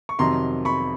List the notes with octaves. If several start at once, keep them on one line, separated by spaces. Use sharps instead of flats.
C#6
F2 C3 D#3 F#3 A#5 C6
B5 C#6